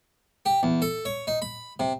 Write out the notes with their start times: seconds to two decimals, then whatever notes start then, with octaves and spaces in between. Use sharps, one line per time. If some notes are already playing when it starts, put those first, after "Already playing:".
0.46 G4
0.63 E2
0.82 A4
1.05 C#5
1.27 D#4
1.42 B5
1.80 C3